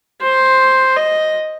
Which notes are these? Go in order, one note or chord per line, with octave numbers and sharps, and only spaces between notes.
C5
D#5